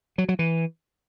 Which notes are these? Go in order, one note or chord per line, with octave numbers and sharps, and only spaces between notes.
F#3
F#3
E3